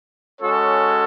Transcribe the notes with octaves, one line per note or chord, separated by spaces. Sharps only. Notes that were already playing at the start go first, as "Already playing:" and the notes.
G#3 C#4 F#4 A4 C#5